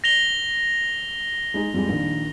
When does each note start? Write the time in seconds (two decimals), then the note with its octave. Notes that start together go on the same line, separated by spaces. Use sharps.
0.04 A#6 F7 G7
1.54 G#3 D#4 G#4
1.74 F2 G3 G#3
1.89 A#1 D#3